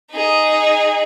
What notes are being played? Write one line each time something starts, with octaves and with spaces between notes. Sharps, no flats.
D#4 G#4